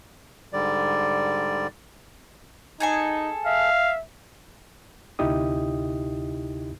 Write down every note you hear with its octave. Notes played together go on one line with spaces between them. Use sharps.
G#2 D3 G3 D5
D#4 G#4 A4 G#5
E5 F5
D2 C3 D#4 E4 G4 D#6